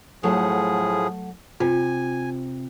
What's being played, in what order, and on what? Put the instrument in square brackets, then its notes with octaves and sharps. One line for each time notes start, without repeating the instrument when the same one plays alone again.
[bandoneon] A2 F3 G#4 [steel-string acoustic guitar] F#3 A3 F#5
[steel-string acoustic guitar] C3 [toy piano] F4 [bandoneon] G#5